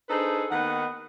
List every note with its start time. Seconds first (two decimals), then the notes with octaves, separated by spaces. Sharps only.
0.09 D4 D#4 G#4 A4 B4 C5
0.51 D#2 D#3 B3 F#5